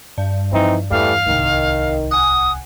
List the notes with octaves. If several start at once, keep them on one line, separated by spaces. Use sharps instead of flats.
G2
E3 F3 C4 D#4
E2 E3 G3 A3 F5
D1 C2 D#3
F#5 G#5 D#6